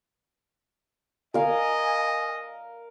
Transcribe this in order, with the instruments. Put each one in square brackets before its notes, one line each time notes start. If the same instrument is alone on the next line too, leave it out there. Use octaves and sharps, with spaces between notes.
[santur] A#4 F5 [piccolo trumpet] D#5 [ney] G#5